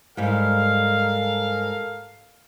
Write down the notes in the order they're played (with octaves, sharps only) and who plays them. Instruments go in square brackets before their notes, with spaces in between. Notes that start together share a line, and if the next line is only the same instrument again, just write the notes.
[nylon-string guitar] G#2 G3 [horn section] A4 A#4 F5